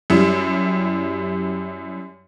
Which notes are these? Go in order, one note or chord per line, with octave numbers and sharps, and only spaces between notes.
F#2 G3 E4